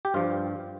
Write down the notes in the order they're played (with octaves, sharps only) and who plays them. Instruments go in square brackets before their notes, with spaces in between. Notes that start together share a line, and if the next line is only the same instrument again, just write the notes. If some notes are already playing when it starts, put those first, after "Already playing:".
[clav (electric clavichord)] G4
G2 F3 F4